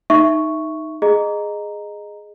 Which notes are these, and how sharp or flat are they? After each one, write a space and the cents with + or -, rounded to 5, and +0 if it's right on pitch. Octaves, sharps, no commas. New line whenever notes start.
D#4 +0 E5 +0 C#6 +0
G#4 +0 D#5 -15 A#5 +0